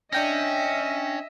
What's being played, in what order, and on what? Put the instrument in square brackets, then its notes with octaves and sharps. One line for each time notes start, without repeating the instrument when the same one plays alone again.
[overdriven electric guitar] C#4 [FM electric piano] D4 G5 A#6 [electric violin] D#5 E5